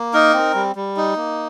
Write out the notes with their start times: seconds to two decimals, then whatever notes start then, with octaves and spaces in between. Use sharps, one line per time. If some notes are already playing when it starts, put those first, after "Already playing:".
Already playing: A#3
0.14 D#4 A#4
0.34 C4
0.55 G3
0.76 G3
0.97 D#4
1.16 A#3